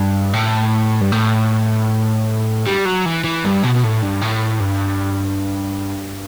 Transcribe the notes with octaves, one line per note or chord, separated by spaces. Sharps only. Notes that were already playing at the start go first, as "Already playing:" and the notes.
Already playing: G2
A2
G2
A2
G3
F#3
E3
E3
G2
B2
B2
A2
G2
A2
G2